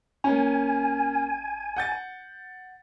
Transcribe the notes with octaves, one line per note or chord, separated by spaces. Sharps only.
A#3 C#4 G#5
F#5 G6 A6